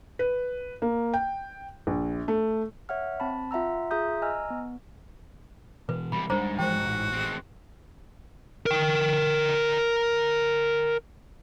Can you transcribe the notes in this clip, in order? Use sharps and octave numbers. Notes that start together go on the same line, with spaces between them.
B4
A#3
G5
A#1
A3
C#5 E5 F#5 F6
C4 A5 B5
F4 E5 F#5 A#5 E6
F4 G#4 E5 A#5 D#6 G6
D#5 G#5 A#5 E6 F6
B3
B2 E3 B4
C2 G3 B5
D1 G#2 G3 D4 C5 A#5
E3 F3 G#3 F#4 C5 G5
A1 A2
G#3 C4
A#4 G5